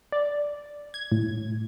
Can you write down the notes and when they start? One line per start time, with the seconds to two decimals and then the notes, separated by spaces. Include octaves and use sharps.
0.12 D5
0.94 G#6
1.12 A2